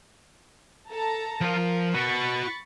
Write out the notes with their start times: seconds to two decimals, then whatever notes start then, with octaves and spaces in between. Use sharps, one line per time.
0.90 A4 A5 A#5
1.41 F3 A#4 F5
1.94 F#4 B4 B5 C#6 A6